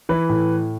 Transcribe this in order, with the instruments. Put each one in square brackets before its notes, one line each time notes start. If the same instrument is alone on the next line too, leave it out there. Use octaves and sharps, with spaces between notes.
[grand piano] E3 B4
A2